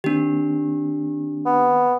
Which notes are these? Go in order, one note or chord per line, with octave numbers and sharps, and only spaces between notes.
D#3 A#3 C4 D4 G4
B3